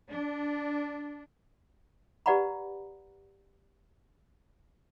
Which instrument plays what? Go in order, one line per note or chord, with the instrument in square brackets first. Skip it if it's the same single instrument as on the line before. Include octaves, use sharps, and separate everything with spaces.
[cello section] D4
[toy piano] G4 B4 D5 F#5 A#5 B5